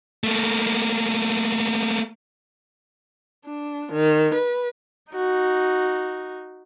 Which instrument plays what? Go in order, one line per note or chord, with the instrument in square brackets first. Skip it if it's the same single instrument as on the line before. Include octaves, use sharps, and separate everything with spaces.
[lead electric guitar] A3 A#3
[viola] D4
D#3
B4
D#4 F#4